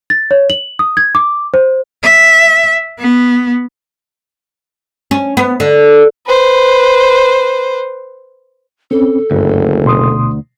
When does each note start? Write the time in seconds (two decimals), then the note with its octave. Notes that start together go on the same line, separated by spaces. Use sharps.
0.10 A6
0.31 C#5
0.50 F#7
0.79 D#6
0.97 G#6
1.15 D6
1.54 C5
2.03 E5
2.99 B3
5.11 C#4
5.37 B3
5.60 D3
6.27 B4 C5
8.91 C4 C#4 A4
9.31 F#1 D2 G2
9.85 B2 C6 D#6